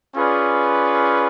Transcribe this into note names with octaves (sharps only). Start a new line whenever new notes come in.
C#4 F4 G#4 B4 D5